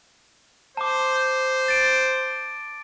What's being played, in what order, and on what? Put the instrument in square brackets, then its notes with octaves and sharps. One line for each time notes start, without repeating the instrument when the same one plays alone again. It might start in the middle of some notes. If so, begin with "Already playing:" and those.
[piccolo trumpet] C5 [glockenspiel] A5 D6
[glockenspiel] A6 D7